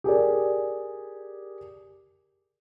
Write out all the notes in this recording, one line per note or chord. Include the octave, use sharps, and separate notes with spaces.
G4 G#4 A#4 D5